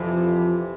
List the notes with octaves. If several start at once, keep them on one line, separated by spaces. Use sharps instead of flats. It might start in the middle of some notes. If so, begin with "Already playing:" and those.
Already playing: F2 C3 E3 F3